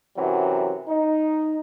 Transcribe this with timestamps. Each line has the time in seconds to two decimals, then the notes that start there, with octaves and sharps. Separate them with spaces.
0.17 F#2 C3 E3 F#3
0.88 D#4